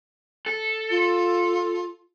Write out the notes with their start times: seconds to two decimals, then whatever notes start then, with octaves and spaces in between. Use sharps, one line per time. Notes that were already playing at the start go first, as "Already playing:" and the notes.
0.46 A4
0.90 F4